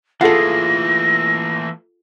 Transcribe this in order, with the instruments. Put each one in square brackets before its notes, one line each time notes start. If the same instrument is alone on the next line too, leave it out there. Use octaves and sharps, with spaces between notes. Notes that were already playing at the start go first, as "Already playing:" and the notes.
[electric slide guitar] E3 A3 A#3 [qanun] F4 G#4 [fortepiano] A4 F#5 [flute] A#6